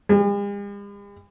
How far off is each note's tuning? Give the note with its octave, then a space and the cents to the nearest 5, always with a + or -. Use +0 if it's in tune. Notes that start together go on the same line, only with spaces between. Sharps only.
G#3 -45